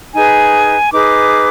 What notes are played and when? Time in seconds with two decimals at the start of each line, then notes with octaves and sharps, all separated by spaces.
0.14 D#4 G#4 B4 G#5
0.92 D#4 G#4 B4 D6